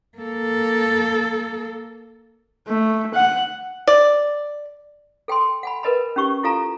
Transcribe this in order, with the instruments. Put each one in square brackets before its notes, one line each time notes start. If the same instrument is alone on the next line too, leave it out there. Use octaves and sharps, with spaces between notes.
[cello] A#3 A4
[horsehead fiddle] A3
F#5
[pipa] D5
[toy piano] A4 G5 A5 C6
F#5 G#5 B5
A#4 B4 D#5 A5 B5
C#4 D#4 G4 C#6
E4 F4 A4 F5 A5 A#5